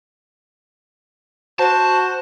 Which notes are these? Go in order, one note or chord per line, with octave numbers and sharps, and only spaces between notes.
F#4 C5 A5